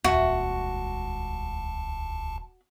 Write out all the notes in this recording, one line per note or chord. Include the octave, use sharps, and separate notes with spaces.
D#1 C#2 G#3 F#4 E5 A5